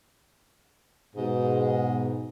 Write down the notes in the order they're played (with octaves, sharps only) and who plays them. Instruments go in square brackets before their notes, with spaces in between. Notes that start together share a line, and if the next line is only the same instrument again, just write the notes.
[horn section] G#2 B2